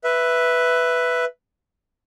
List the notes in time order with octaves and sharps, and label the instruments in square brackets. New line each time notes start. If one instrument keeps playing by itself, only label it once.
[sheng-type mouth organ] B4 E5